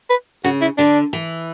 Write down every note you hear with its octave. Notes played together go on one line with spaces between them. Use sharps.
B4
C#3 F#4
E4
D3 D4
E3